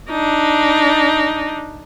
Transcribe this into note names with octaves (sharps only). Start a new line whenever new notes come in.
D4 D#4